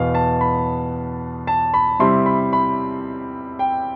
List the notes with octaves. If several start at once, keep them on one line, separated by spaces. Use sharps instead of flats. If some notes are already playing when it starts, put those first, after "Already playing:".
Already playing: E2 B2 B3 F5
A5
B5
A5
B5
C3 G3 C4 E4 C6
B5
B5
G5